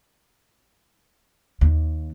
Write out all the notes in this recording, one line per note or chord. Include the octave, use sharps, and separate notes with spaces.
D#2